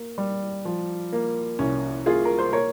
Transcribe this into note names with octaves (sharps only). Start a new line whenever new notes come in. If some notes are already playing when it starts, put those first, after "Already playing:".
Already playing: A#3
G3
F3
A#3
C2 C#4
A#3 F4 G#4
A#4
C5
A#3 A#4 C#5